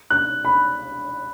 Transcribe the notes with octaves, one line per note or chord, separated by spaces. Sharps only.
F#6
B5